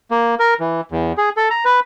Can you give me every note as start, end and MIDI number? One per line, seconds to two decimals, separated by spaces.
0.11 0.35 58
0.39 0.54 70
0.60 0.81 52
0.91 1.13 40
1.18 1.29 68
1.37 1.49 69
1.50 1.65 82
1.65 1.80 71